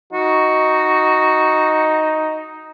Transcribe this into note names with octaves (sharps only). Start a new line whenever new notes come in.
D#4 F#4